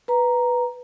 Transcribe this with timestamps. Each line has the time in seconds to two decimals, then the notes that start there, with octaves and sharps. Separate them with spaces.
0.08 B4 A#5